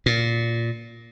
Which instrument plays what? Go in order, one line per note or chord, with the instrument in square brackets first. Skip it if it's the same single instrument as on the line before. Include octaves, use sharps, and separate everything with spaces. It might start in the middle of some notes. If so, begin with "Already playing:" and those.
[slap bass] A#2